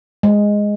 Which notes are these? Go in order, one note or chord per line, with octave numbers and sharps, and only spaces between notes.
G#3